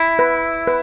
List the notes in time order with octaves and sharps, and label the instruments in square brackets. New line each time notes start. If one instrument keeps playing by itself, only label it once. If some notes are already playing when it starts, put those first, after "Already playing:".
Already playing: [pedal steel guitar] E4
[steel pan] B4
B4